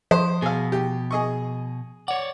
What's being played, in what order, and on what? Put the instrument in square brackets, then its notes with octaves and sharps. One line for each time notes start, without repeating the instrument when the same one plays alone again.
[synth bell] F3 [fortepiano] C5
[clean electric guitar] B2 [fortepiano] G#4 F5
[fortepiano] G4
G#4 D#5 C#6
[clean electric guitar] C#5 D5 [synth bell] F#5